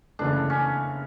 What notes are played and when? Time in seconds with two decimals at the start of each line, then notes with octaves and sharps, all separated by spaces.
0.19 F#1 F#2 C#3 E3 A3 D4
0.50 C#4